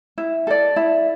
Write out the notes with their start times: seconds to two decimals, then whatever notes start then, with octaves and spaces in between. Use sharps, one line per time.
0.18 E4
0.47 A4 D5
0.76 E4